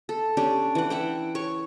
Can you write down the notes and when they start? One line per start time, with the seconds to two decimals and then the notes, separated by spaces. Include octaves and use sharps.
0.09 A4
0.37 C#4 D4 G4 G5
0.75 E3 F#5
0.90 E5 F#5 G5
1.35 C#5 C#6